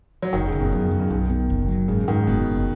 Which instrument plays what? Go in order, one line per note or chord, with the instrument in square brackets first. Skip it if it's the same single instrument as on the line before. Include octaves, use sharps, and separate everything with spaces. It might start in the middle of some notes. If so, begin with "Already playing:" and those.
[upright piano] F#3
[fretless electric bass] F#1 [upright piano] D#3
[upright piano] C#3
[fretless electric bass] F#1
[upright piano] B2
[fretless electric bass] F#2 [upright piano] C#3
[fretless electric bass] F#2
[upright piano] C#3
[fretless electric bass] B1 [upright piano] D#3
[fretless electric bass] B3
F#1
F#3
[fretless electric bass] G#2 [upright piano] C#3
[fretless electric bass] G#2 [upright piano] D#3
[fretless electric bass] F#1 [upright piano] B2
[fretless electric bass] F#1